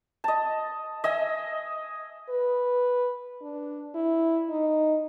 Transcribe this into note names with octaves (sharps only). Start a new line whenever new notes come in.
D#5 A5
D#5 E5 G#5
B4
D4
E4
D#4